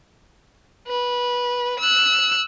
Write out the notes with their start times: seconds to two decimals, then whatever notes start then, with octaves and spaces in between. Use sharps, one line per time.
0.88 B4
1.79 E6 F#6